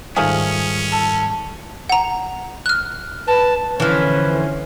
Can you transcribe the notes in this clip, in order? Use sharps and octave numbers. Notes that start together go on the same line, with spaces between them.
G#2 D#3 F3 G3 A3 C#4 G#4
A4
F#5 A#5
F6 F#6
B4 A5
D3 E3 F3 C#4 B4